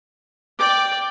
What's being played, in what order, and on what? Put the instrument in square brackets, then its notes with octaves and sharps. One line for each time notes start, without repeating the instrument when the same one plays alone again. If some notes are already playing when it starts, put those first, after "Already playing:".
[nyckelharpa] D5 G5 [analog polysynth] D6